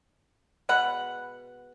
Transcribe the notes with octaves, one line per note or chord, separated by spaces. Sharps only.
B2 G#3 F#5 B5